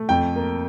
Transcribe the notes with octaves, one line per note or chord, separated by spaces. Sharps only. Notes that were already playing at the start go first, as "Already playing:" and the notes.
Already playing: A3
F2 G5
A#3